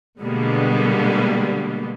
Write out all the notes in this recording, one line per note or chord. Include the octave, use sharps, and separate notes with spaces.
B2 D3 G3 G#3 A#3 B3